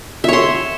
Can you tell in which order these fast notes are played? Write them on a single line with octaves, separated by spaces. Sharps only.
E5 C#5 C6